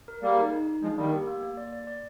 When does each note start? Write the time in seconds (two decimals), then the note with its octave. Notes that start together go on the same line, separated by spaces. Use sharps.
0.08 A#4
0.23 G3 A#3 G#4
0.38 D#4
0.53 D#4
0.67 D#4
0.82 F3 G#3 D4
0.97 D#3 G3 A#3
1.13 G4
1.27 A#3
1.43 A#3
1.57 D5
1.72 D5
1.87 D5